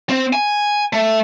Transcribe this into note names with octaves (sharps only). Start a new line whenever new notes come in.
C4
G#5
A3